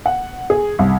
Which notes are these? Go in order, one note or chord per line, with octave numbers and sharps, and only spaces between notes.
F#5
G#4
C2